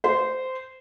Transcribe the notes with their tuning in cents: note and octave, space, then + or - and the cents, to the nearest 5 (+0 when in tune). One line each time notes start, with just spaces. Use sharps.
C5 -15